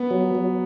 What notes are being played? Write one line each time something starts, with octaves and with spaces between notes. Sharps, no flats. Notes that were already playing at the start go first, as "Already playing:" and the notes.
Already playing: B3
F#3
F#3